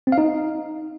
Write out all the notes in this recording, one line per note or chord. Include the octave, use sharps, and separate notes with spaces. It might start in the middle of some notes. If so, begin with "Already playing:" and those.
C4
F5
D#4